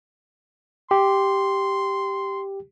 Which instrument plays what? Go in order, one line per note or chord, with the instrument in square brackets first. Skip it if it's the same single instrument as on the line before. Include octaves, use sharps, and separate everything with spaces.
[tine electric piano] G4 [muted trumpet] C6